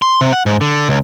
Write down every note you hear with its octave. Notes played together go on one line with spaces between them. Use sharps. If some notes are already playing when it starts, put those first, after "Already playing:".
C6
C3
F#5
G#2
D3
C#2